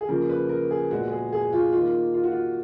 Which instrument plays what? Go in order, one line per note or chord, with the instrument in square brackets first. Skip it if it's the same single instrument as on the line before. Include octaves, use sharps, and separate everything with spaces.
[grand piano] G#4
C#3 F3 A#3 A#4
B4
A#4
G#4
A#2 G#3 B3 F#4
G#4
G#4
F4
D#3 A#3 F4
F4
F#4
F4